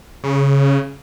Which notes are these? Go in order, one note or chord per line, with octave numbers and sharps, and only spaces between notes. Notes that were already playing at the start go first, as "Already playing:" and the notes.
C#3